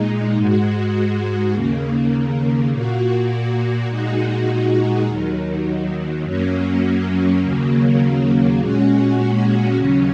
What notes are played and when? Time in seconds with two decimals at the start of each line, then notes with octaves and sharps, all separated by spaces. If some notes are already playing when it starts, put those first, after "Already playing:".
Already playing: A#2 G#3 D#4
0.37 G#2 G#3 F#4
1.54 D#2 C#3 A#3
2.72 A#2 A#3 F#4
3.89 A#2 G#3 D#4 F#4
5.06 D#2 D#3 F#3
6.24 F#2 F#3 A#3 C#4
7.42 D#2 C#3 F#3 A#3
8.60 A#2 G#3 C#4 F#4
9.77 D#2 C#3 F#3 C#4